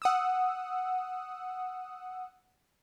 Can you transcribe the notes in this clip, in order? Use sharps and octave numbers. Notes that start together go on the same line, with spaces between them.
F#5 D#6 E6